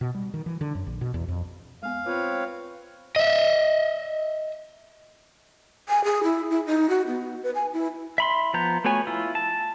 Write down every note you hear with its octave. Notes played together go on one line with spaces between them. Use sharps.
B2
G3
D#3
E3
D3
F#2
A#1
B2
E2
F2
G#3 B3 F5
C4 F4 B4 C#5
D#5 E5
G#5
G#4
E4
E4
D#4
F#4
B3
B4
G#5
E4
E5 B5 C6
F3 B3 A#5 G6
A3 B3 F#4 C#5 G#5
E4 F4
A5